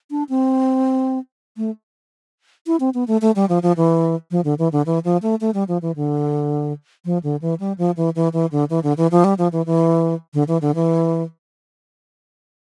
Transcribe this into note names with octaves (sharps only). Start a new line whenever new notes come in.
D4
C4
A3
E4
C4
B3
A3
A3
G3
F3
F3
E3
F3
D3
E3
D3
E3
F3
A3
A3
G3
F3
E3
D3
F3
D3
E3
G3
F3
E3
E3
E3
D3
E3
D3
E3
F3
G3
F3
E3
E3
D3
E3
D3
E3